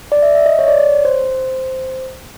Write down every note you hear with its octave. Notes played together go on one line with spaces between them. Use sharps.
D5
E5
E5
D#5
C#5
D5
C#5
C5